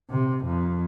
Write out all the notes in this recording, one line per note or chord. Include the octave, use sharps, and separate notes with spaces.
C3
F2